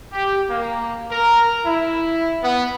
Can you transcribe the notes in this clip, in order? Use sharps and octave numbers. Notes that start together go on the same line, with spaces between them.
G4
A#3
A#4
E4
B3